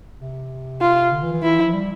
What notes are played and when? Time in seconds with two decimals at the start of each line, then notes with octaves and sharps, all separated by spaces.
0.20 C3
0.81 F4
1.12 D3
1.23 E3
1.33 E3
1.43 E3 E4
1.59 F3
1.74 G3